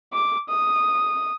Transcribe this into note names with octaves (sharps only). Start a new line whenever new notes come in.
D6
D#6